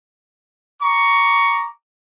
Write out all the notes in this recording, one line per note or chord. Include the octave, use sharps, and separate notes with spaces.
A#5 C#6 D6